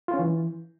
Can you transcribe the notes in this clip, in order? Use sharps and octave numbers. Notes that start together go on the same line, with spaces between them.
F4
C#4
E3